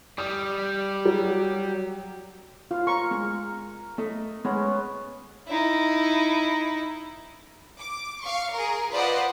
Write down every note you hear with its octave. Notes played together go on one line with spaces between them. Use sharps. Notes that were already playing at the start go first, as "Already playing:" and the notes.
G3 D#6
F#3
F4 F5
A#4 C6 C#6
G#3
A3 D#5
G#3 B3 C#4 C#5
D#4 E4
D6
F5 C#6
G#4 A#4
F4 B4 C5 D5 D#5 F#5